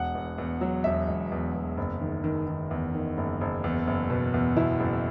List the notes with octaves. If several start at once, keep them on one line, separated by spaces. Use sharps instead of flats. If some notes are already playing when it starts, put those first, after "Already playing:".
Already playing: E1 F#5
E2
E2
F#3
E1 E5
E1
E2
E2
F#1
D#3
D#3
D#3
E2
D#3
F#1
F#1
E2
F#1
B2
E2
B2 E4
F#1